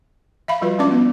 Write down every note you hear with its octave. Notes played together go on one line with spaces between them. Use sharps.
E5 F5 B5
F3 G3 F4 F#4 B4
G#3 C#4 D4 D5 D6
B3